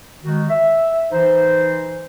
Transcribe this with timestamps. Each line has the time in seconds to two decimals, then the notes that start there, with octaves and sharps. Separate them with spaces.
0.24 D#3 G#3 F#4
0.50 E5
1.12 E3 D#4 C5